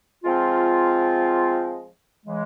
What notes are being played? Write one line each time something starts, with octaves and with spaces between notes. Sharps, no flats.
F3 G#3 C4 F4
C#3 E3 G#3